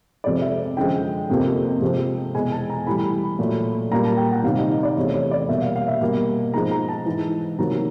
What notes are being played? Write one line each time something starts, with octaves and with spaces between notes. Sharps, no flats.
F2 C3 F3 G#3 D5
E5
F#2 D3 F3 G#3 G5
F2 C3 F3 A#3
C3 F3 G#3
E2 B2 G#3 G#5
A5
A#5
A2 E3 G3 B5
A#2 F#3 A3
A#2 G3 A#3 A#5
A5
G5
F#5
C3 D#3 G3 F5
D#5
D#5
D5
E2 C3 E3 A3 C#5
C#5
D5
B2 G3 A#3 E5
F5
F5
E5
B2 G3 A#3
G#2 F3 G#3 A#5
A#5
A5
G#2 E3 G#3
C3 D#3 F#3 A#3 A#5